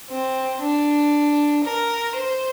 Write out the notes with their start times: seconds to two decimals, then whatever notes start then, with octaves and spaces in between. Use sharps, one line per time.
0.10 C4
0.61 D4
1.64 A#4
2.16 C5